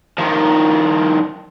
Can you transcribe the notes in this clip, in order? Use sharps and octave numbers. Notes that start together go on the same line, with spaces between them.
D#3 F3